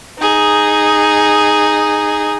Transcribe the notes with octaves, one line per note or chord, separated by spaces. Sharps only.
D#4 G#4